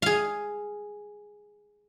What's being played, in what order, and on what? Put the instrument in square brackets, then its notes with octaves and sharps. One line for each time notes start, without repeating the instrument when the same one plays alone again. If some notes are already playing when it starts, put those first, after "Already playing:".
[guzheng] G#4 F5